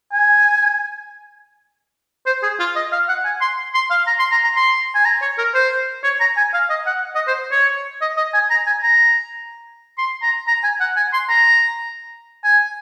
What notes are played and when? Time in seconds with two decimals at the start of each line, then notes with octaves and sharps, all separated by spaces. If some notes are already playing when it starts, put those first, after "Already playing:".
0.13 G#5
2.26 C5
2.43 G#4
2.60 F4
2.76 D#5
2.92 F5
3.09 F#5
3.25 G#5
3.41 C6
3.75 C6
3.91 F5
4.07 A#5
4.19 C6
4.32 A#5
4.44 A#5
4.56 C6
4.95 G#5
5.05 A#5
5.22 C#5
5.38 A#4
5.54 C5
6.04 C#5
6.20 A#5
6.37 G#5
6.54 F5
6.70 D#5
6.86 F#5
7.15 D#5
7.27 C5
7.52 C#5
8.01 D#5
8.17 D#5
8.34 G#5
8.51 A#5
8.66 G#5
8.83 A#5
9.98 C6
10.23 A#5
10.48 A#5
10.64 G#5
10.81 F#5
10.97 G#5
11.13 C6
11.29 A#5
12.44 G#5